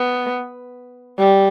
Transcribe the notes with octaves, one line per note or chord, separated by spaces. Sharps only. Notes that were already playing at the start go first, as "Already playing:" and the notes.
Already playing: B3
G3